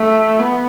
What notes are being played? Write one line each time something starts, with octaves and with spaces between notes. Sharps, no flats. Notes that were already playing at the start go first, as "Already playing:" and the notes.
Already playing: A3
B3